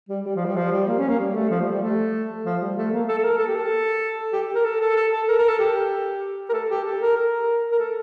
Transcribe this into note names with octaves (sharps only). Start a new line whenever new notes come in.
G3
G3
F3
G3
F3
G3
A#3
C#4
A#3
G3
A3
F3
G3
G3
A3
F3
G3
A3
A#3
A4
A4
A#4
A4
G4
A4
G4
A#4
A4
A4
A4
A4
A#4
A#4
A4
G4
A#4
A4
G4
A4
A#4
A#4
A#4
A4